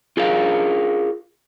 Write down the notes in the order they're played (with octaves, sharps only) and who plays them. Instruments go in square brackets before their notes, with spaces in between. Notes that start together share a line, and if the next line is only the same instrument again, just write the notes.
[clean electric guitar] F4 G#4 A#4 F5